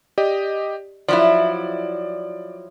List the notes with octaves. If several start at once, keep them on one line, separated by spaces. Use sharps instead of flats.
G4 D5 D#5
F3 F#3 E4 D5